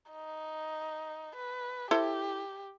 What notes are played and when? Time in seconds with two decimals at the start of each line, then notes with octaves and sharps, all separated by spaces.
0.12 D#4
1.36 B4
1.91 E4 G4 A4 C5